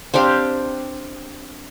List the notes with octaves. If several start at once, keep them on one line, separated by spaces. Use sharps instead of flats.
C4 D4 G4 F5